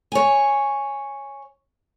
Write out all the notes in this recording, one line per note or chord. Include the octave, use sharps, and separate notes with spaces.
C#5 G#5